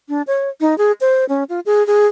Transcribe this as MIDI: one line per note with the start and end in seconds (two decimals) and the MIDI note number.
0.09 0.22 62
0.27 0.49 73
0.60 0.77 63
0.78 0.92 68
1.01 1.25 72
1.29 1.44 61
1.49 1.60 65
1.66 1.85 68
1.87 2.07 68